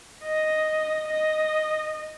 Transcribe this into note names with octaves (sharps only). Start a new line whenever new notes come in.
D#5
D#5